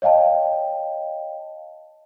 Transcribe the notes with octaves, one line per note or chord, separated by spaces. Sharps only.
C#5 D#5 F5 G5 A5